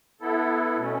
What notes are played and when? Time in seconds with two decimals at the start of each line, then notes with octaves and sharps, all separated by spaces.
0.21 B3 E4 A4
0.77 B2 A3 C#4